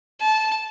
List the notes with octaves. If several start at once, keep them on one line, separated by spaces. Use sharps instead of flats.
A5